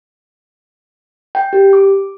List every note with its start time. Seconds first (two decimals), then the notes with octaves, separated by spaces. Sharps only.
1.35 G5
1.53 G4
1.73 D6